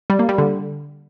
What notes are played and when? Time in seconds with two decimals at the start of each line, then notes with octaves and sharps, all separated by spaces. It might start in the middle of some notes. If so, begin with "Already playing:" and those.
0.10 G3
0.19 A#3
0.29 G3
0.38 D3